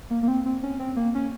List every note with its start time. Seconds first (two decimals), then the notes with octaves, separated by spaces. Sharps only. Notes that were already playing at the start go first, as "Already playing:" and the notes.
0.10 A#3
0.23 A#3
0.28 C4
0.46 C4
0.63 C#4
0.79 C4
0.96 A#3
1.15 C#4